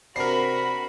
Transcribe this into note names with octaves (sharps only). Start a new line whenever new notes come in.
C3 D4 F#4 A#4 B5 C7